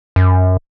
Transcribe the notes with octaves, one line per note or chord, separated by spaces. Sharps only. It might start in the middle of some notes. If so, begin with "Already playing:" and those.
F#2